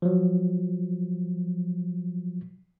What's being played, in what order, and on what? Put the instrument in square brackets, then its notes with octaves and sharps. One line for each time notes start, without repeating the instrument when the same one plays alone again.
[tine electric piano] F3 F#3